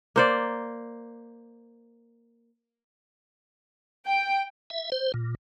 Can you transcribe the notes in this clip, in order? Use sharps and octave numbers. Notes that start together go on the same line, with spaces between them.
A#3 C5 D5
G5
E5
C5
A#2